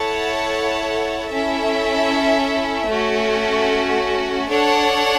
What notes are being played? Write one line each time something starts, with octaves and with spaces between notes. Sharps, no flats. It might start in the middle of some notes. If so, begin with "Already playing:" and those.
Already playing: E4 A4 C#5 F#5 A5
C#4 E4 A4 E5
A3 C#4 F#4
D4 A4 C#5 F#5